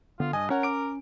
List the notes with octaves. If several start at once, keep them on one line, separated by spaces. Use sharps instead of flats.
D3 B3 F4
G2 D#5 G#5
C#4 A#4 C#5 F#5 G#5
D6 D7